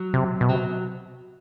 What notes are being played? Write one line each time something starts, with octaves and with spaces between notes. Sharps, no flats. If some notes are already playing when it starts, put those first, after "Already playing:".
Already playing: F#3
C3
B2
C3 F#3